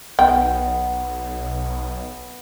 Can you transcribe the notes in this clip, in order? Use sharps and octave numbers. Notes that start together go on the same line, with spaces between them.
B1 B3 G5